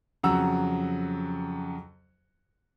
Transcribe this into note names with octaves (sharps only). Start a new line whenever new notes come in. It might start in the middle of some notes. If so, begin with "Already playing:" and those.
F2 C#3 F#3 F#5 A#5 E6